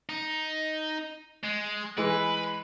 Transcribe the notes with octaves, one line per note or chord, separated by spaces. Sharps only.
D#4
G#3
E3 G#3 B4